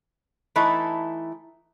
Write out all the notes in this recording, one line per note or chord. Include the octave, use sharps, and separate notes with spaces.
E3 A3 D#4 E4 A4